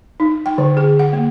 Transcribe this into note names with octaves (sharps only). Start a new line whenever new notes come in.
D#4
G5
D3
G#4
F#5
A#3